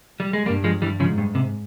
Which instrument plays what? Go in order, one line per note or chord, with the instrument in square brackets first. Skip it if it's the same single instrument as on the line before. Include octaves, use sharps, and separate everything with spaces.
[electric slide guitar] G3
G#3
[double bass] G2 [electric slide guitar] G3 A#3
[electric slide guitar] F3 G#3
E3 G3
[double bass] G#2 [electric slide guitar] C#3 F3
[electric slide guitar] G2
C3